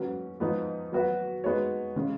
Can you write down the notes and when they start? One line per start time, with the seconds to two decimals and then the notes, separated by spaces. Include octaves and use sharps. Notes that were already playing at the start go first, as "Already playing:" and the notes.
Already playing: G#2 F#3 C#4 F#4 B4
0.40 G#2 F3 B3 D#4
0.92 F#3 B3 F#4 B4
1.44 G#3 B3 D#4 F#4 C#5
1.96 C#3 G#3 C#4